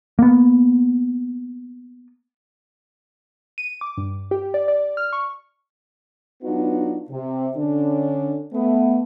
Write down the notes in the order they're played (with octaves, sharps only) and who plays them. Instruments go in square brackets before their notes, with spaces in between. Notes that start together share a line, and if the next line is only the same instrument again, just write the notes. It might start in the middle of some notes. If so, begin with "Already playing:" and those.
[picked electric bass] A#3 B3
[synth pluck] D#7
D6
G2
G4
D5
D5
F6
C#6
[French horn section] F#3 B3 D4 D#4 F4 F#4
C3
D3 C#4 D4
A3 B3